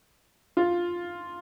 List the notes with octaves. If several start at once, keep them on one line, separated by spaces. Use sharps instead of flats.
F4